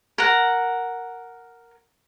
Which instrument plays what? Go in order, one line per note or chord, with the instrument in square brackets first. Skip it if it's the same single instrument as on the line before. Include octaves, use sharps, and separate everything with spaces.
[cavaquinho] A#4 F#5